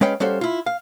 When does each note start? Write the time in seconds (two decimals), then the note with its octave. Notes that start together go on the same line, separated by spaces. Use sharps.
0.01 G#3 C#4 B4 F5 G5
0.20 G3 C#4 F#4 A4 C5 F5
0.41 E4 F4
0.66 F5